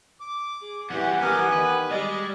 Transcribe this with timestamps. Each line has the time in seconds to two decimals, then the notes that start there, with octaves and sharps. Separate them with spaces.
0.20 D6
0.61 G#4
0.90 E2 E3 G3 G4 F#5
1.21 B3 A#4 F#5 G#5 D6
1.52 D#3 B4
1.91 G3 G#3 D5 D#5